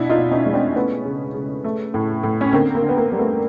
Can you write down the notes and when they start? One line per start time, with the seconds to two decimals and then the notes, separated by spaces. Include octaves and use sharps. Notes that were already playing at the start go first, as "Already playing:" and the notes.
Already playing: B2 D4 E4
0.09 D#4 F4
0.17 B2
0.32 C#4 D#4
0.46 G#3
0.53 C4 D4
0.76 A3 B3 C#4
1.05 C#3
1.34 C#3
1.64 A3
1.94 A2
2.23 A2
2.41 C#4
2.53 D3 A#3 C4
2.75 A#3
2.82 D3
2.89 B3
2.97 A#3
3.12 G3
3.19 A3 B3